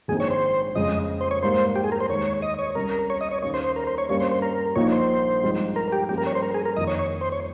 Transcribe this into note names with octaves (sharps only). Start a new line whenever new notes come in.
A#1 G#2 D#3 G#3 C4 G#4
C#5
C5
F2 C#3 G#3 C#4 D#5
C5
C#5
G#2 G3 A#3 C5
G4
G#4
A#4
C5
D#2 D#3 G#3 C#5
D#5
C#5
C2 C3 G3 C#4 A#4
C#5
D#5
C#5
D#2 D#3 A#3 C#4 C#5
C5
C5
A#4
C5
C#5
G2 G3 A#3 C#4 C#5
C5
C5
A#4
A#1 A#2 F3 A#3 D#4 C#5
C5
G2 F3 G#3 C4 D#4
A#4
G4
G2 F3 A#3 C#4 G4
A#4
C#5
C5
A#4
G#4
A#4
F2 D#3 A#3 D#4 D#5
C#5
C#5
C5
C#5